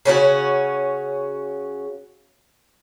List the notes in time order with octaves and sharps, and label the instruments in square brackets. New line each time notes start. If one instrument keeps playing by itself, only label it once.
[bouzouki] C#3 C#4 D4 F#4